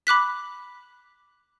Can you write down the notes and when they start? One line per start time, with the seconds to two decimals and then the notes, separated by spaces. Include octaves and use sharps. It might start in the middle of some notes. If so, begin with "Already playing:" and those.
0.07 B5 D6 F#6 B6